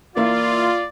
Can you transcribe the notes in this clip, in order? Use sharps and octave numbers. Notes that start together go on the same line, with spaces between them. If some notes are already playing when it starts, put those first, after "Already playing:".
E3 A#3 E4 F4 D5